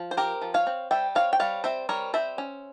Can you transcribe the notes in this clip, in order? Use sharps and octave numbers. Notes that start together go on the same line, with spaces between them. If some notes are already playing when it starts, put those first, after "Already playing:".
Already playing: F3
C5
C4 G4 A#4
F3
C#5 F5
C4
G3 E5 G5
C4 C#5 F5
G5
G3 C#5 F5
C4 C5 E5
G3 A#4 C#5
C4 C5 E5
C#4